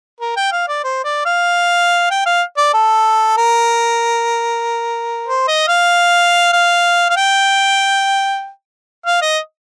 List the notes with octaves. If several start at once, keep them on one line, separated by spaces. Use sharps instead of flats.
A#4
G5
F5
D5
C5
D5
F5
G5
F5
D5
A4
A#4
C5
D#5
F5
F5
F5
G5
F5
D#5